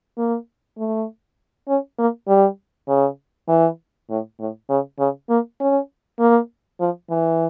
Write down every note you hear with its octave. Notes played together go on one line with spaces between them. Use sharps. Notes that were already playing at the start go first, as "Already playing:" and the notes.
A#3
A3
C#4
A#3
G3
C#3
E3
A2
A2
C#3
C#3
A#3
C#4
A#3
F3
E3